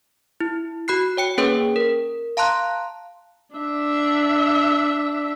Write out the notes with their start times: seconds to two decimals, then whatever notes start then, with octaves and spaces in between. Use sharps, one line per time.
0.40 E4
0.88 F#4 B5 F#6 C7
1.17 C#5 G5 C#7
1.38 A#3 C#4 G#4 B4 C#5 G5
1.76 A#4
2.37 F5 A5 A#5 C6 F#6
3.55 D4 E5